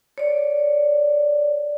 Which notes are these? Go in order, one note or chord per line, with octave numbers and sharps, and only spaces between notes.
C#5 D5